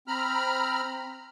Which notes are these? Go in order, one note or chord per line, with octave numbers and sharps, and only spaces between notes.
C4 A#5 B5 F6